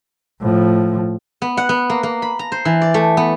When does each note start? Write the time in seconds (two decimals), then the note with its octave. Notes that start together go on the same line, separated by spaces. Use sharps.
0.41 A2 F3
1.42 B3
1.57 F#5
1.69 B3
1.90 A#3
2.03 A#3
2.22 B5
2.39 A#5
2.52 C5
2.65 E3
2.82 D5
2.94 A3
3.17 B3